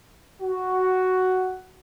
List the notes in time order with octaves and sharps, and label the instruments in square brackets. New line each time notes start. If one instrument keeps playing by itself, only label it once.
[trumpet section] F#4